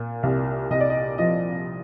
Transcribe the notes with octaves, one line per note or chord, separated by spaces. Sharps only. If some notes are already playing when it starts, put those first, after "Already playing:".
Already playing: A#2
C2
C2 D#5
D5
D#5
F3 D#5